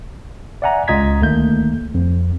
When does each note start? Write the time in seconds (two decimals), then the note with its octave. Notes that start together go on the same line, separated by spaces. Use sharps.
0.62 D5 E5 F#5 G#5 A#5
0.88 C#2 F4 D#5 A#5 G#6 B6
1.21 D2 D#3 A3 A#3 G6
1.94 F2